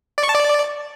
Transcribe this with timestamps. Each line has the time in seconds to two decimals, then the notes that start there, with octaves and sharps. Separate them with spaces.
0.18 D5
0.23 C#6
0.29 A5
0.35 D5